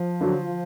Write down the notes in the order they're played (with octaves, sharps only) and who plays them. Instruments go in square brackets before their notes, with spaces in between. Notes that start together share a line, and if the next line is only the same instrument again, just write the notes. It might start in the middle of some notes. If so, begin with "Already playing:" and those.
Already playing: [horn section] F3
[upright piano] D3 F#3